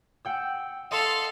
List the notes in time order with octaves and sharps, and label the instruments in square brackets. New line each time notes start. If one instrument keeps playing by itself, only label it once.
[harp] F#5 G5 E6
[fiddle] A4 F5 [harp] D#5 C6